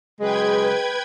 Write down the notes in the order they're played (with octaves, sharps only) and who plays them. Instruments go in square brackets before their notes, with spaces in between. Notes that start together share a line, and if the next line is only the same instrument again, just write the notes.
[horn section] C#3 F#3 G#3 [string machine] B4 G5 G#6